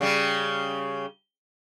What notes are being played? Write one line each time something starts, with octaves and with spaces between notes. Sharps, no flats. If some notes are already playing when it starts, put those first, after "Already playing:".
C#3 G3